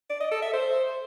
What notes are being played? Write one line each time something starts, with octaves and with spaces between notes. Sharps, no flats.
D5
D#5
A4
E5
C5